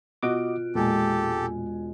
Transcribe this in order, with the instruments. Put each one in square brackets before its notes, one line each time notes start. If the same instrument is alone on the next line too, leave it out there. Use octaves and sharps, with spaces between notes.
[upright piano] B2 F#6 D7 [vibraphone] F4 [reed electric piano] F#4 D#5 D6
[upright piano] E1 G#3 G#5 [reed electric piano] A#2 [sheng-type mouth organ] G4 A4